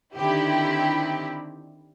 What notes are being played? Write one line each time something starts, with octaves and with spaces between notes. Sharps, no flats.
D3 D#3 C4 E4 G4